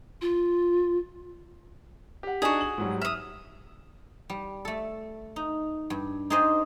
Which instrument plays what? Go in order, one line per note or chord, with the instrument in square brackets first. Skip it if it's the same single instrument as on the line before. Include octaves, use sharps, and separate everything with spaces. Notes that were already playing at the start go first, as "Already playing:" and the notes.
[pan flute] F4
[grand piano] G4 F#5
[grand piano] D4 D#4 [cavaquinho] F#4 G#4
[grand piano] F#7
G#2 F#3 G3
[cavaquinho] E5 D#6 [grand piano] F6
[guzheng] G3
A3 A4
D#4
G2
D#4 G4 G#4 C5 D5 D#5